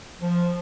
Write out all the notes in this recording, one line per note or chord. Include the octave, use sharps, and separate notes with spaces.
F3